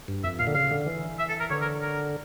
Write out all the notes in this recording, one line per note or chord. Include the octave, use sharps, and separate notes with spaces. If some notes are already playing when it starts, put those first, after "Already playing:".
G2
F2 E5
A#2 F5
D3
C#3 F5
D3
E3
E5
A4
A#4
D3 C#5
A#4
A#4